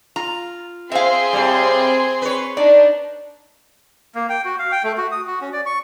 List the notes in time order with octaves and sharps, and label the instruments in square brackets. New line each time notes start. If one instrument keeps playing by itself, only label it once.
[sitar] F4 [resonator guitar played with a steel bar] A#5
[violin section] C4 G#4 C6 [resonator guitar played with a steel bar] E5 F5
[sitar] A2 G3
B4 C#5
[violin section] D4 D#4 [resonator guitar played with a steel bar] D5
[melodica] A#3
G5
F#4
F5
G5
A3
F#4
D#6
F#4
C#4
D5
C#6